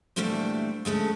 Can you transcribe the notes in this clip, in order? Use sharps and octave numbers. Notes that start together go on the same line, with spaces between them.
E2 A#2 G3 A3 D4 C5
D2 G#3 A3 C#4